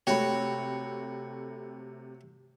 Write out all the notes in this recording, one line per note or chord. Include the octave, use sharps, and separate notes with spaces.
C3 A3 F#4 C#5 G5 B5